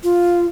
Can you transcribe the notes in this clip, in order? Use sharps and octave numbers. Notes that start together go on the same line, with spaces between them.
F4